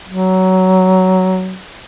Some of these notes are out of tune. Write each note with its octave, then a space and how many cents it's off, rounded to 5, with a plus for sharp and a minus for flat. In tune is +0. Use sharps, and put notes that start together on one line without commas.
F#3 +15